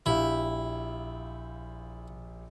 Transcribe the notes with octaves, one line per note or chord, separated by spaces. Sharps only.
A#1 E4 G4 F5